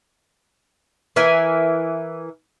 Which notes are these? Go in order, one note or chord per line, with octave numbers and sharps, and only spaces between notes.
E3 A#4 E5 G#5